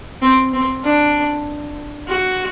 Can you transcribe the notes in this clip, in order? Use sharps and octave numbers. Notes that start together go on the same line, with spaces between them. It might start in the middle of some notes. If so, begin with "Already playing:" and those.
C4
C4
D4
F#4